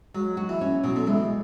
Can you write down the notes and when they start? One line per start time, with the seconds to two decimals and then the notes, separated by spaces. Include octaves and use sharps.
0.14 F#3 G#3
0.37 F#4
0.49 E3
0.61 C#4
0.83 B2 F#3
0.96 D3
1.07 E3 G#3